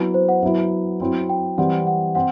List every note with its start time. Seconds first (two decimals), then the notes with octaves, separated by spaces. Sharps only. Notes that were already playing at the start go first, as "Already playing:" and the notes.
Already playing: F#3 B3 E4 B4
0.14 C5
0.29 F#5
0.43 F#3 B3 E4 E5
1.00 F#3 C4 E4
1.29 G5
1.58 E3 G3 C4 E4 F#5
1.87 F#5
2.15 C4 F#5